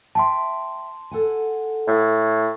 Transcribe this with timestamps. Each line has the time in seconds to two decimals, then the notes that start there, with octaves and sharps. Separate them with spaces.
0.15 E5 G5 A5 C6
1.11 A4 F#5 G#5
1.87 A2